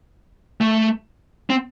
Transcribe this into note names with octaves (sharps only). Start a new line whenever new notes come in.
A3
C4